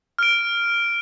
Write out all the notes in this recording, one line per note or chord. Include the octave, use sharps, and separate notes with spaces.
F6 D7